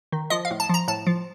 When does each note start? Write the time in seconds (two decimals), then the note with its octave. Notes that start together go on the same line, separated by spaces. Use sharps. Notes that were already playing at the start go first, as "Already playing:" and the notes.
0.12 D#3
0.30 F3 D#5
0.45 F5
0.51 A2
0.60 A5
0.69 F3 A#5
0.88 A2 A5
1.07 F3